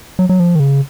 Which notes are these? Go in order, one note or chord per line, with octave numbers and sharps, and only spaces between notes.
F#3
F#3
F3
D#3
C#3